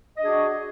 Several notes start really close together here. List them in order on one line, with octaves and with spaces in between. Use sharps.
D#5 D4 G#4 F#4